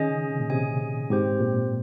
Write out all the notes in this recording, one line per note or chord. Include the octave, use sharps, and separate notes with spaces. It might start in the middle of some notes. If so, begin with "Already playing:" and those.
Already playing: D#3 C#4 G#4 D#5 G#5
C#3
C3
A#2
C3 C#4 G#4 D#5 G#5
G#2 C4 G4 C5
A#2